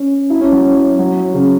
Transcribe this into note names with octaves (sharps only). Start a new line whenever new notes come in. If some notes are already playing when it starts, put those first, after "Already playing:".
Already playing: C#4
E4
C#4
F#3
F#3
C#3